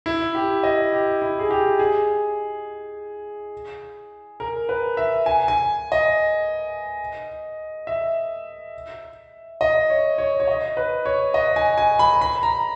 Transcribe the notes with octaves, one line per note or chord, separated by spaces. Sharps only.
E4
G4
D#5
G4
E4
G#4
G4
G#4
A#4
B4
E5
G#5
G#5
D#5
E5
D#5
C#5
C#5
C#5
D#5
B4
C#5
D#5
G#5
G#5
B5
B5
A#5